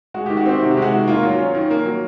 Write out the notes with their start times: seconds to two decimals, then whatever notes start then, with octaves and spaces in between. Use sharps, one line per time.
0.14 G#3 F#4
0.26 D#3 G4
0.37 F#4
0.46 C4 G4
0.60 C3 F#4
0.71 G4
0.77 G#3
0.82 F#4
0.92 D#3
1.08 A#3 F4
1.23 F#3
1.38 C#4
1.55 D#3
1.71 A#3
1.85 F#3